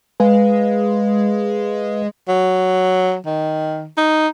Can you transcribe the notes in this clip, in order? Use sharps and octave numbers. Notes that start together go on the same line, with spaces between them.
G#3 B4 F5
F#3
D#3
D#4